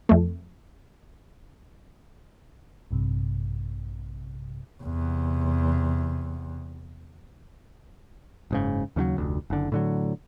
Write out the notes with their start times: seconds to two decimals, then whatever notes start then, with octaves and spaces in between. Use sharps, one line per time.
0.09 F2 A3
2.91 A#1 G2 C3
4.83 E2 C3
8.51 F#1 G#2 C#3
8.96 D#2 C#3 E3 F#3
9.17 F1 D2
9.50 F#1 D3
9.72 A2 D3 F#3